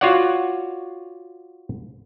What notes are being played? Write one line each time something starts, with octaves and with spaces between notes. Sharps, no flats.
F4 F#4 C#5 D5 F#5